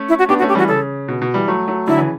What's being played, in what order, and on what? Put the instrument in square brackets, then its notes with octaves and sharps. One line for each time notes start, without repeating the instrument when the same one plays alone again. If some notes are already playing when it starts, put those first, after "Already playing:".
Already playing: [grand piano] A3 C#4
[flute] E4
F#4
[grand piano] B3 D4 [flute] G4
[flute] F#4
[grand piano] A3 C#4
[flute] G4
[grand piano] E3 G3 [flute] F#4
[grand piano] C#3 [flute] A4
[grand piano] B2
B2
E3 G3
F#3 A3
F#3 A3
[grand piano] D3 F#3 [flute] E4
[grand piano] C#3 E3